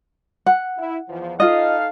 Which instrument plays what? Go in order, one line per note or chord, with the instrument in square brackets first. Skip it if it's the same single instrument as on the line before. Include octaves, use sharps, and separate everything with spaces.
[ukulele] F#5
[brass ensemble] E4
E2 F3
[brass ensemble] D#4 A4 F5 [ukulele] F4 D#5